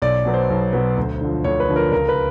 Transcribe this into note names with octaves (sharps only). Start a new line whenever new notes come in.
B1 D5
B2 F#3 B3
C5
B1
B2 F#3 B3
D2
D3 F3
D2 C#5
B4
D3 F3
A#4
C#2 A#4
B4